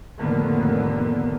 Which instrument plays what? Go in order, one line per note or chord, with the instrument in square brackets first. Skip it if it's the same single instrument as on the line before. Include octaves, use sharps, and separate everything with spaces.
[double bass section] F1 A2 D3 D#3 A#3 B3